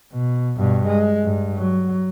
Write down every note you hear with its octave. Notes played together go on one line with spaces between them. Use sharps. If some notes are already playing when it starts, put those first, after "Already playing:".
B2
G2 B2
G#3
G2
F#3